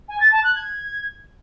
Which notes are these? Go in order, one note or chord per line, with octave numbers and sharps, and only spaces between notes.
G#5
A6
A5
F#6
G#6